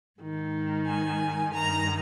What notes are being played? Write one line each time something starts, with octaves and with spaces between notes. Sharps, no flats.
G#2 D#3
G#5
G2 D#3 A#5